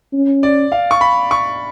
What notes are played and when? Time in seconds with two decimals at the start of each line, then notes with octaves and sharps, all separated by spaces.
0.13 C#4
0.43 D5
0.72 F5
0.91 C#6
1.01 B5
1.31 C#6